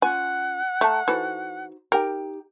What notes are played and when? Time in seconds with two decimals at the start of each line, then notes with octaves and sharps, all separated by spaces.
0.02 C#4 D#4 F4 F#5 G#5
0.81 A3 A5 A#5
1.08 E3 D#4 F#4 A4 C5
1.92 D#4 G4 A#4 G5